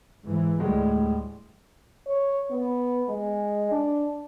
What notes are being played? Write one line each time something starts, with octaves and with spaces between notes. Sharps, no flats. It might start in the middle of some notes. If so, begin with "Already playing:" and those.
G#2 E3
D2 A2 G3 G#3
C#5
B3
G#3
D4